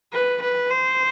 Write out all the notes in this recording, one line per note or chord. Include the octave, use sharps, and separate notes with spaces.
B4
B4
C5